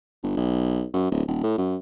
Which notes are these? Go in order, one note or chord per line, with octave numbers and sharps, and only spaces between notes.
G1
B1
F#2
D1
D#1
A2
F#2